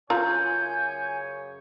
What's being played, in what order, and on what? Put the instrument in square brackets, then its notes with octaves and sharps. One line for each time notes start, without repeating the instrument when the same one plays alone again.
[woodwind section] F#2 C#3 C#5 [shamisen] F4 A#5 [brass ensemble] G#5 [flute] G6